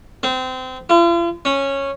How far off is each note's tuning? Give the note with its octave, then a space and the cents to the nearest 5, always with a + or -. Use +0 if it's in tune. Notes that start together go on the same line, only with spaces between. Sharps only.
C4 -25
F4 -45
C#4 -10